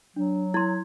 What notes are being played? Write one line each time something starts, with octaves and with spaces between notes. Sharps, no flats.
F#3 D4
E4 C6 G#6